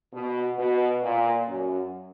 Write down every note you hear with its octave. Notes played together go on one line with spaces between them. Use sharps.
B2
B2
A#2
F#2